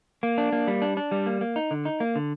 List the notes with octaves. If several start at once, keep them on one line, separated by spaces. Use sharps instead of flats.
A#3
D4
A#3
G3
D4
D4
G3
A#3
A#3
D#4
D3
D#4
A#3
D3